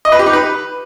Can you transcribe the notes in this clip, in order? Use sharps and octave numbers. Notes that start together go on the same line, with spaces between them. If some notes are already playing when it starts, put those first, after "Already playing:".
D#5
B4
G4
D#4
B4